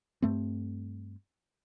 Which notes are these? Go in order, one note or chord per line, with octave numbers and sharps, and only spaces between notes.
G2 A3 C4